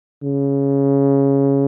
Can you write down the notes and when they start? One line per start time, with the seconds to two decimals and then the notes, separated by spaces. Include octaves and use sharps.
0.24 C#3